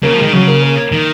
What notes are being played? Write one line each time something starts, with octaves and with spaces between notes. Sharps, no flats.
C#3 A#3
F3
D#3 G#3
C#3 F#3
A#3
A#3
D#3